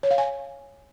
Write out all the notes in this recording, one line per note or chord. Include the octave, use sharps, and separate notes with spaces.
C#5
F5
G#5